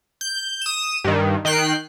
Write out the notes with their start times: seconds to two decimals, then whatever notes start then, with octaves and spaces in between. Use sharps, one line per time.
0.21 G6
0.62 D#6 E7
1.04 G2 D#3
1.45 D#3 G5 F#6 C7